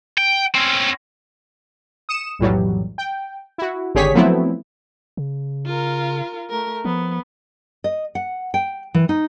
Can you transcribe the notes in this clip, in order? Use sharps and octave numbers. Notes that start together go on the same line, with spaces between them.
G5
C4 C#4
D#6 C#7 E7
B1 F2 A2 E3 F#3 G3
G5
E4 F#4
G#1 D3 G4 G#4 C#5 B6
F3 F#3 A3 B3 C4 E4
C#3
F4 A#4
A3 A#4
F3 B3
D#5
F#5
G5
E3
D#4